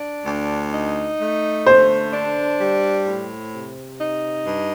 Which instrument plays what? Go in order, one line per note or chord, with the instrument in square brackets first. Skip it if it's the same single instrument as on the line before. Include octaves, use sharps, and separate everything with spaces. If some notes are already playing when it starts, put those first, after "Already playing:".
Already playing: [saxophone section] D4
D2
D#4
A3
[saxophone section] D3 [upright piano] C5
[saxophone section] D4
G3
A2
C3
D#4
G2